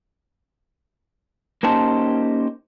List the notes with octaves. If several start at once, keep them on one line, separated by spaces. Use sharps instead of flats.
A#3 C#4 D#4 G4 C5 A5